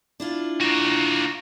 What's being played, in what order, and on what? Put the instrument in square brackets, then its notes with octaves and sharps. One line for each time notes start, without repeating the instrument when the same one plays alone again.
[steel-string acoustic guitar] D4 E4 F4
[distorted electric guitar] A#3 F#4